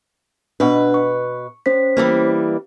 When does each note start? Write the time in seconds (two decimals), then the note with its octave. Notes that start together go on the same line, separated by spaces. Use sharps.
0.60 B2 D4 B4 D#5 F#5
0.94 C#6
1.66 C#4 C5 B6
1.97 E3 G3 A#3